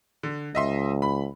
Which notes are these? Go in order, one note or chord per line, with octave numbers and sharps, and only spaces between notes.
D3
C#2 D#5 E5 C6
B5